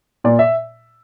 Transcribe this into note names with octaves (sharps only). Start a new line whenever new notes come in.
A#2 D5
E5